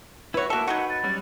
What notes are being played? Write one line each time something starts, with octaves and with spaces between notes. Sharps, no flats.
E4 F#4 B4 C#5
A#3 F#4 A4 E5
F#3 D#4 F#4 B4 F#5
A6
F#3 G3 C#4